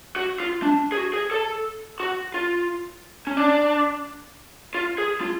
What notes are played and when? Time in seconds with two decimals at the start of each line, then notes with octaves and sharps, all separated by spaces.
0.16 F#4
0.40 F4
0.63 D4
0.92 G#4
0.97 F#4
1.14 G#4
1.31 A4
2.00 F#4
2.34 F4
3.27 C#4
3.37 D4
4.75 F4
4.98 G#4
5.21 F4